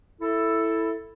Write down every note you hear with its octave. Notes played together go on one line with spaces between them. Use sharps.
E4 A4